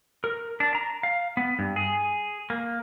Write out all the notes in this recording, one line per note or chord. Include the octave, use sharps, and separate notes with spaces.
A#4
D4
A#5
F5
B3
G2
G#4
A#3